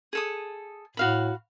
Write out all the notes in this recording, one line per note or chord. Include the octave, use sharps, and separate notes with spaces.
G#4 A4 D#6
A2 F#4 F5 B5